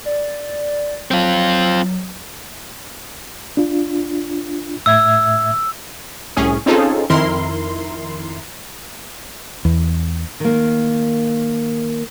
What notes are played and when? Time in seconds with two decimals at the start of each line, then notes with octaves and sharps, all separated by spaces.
0.05 D5
1.11 F#3 C4 F4
3.57 D4 F4
4.86 A2 E5 E6 G#6
6.36 C2 A2 C#4 G#4
6.66 C4 C#4 D#4 F4 G#4 A4
7.10 F2 D#3 E4 A#4 C6
9.65 E2
10.40 D#3 A#3